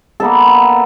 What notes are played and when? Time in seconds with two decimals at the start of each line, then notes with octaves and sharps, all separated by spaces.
0.20 A#3 B3 D#4 A4